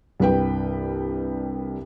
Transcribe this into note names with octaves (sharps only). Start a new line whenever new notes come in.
C2 G2 B4 G5